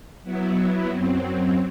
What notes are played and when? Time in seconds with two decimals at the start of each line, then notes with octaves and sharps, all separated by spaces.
0.24 F#3 B3 E4
0.88 F#2 F#3 C4